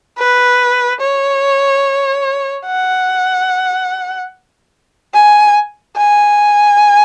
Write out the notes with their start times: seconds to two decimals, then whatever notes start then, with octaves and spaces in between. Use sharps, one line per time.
0.19 B4
1.01 C#5
2.66 F#5
5.14 G#5
5.97 G#5